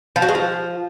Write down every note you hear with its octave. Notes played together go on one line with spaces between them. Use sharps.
F3
F#4
G#3
F3